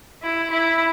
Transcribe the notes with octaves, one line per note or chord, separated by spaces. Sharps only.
E4
E4